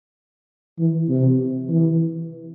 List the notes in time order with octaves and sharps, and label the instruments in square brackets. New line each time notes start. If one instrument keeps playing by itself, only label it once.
[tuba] E3
C3
E3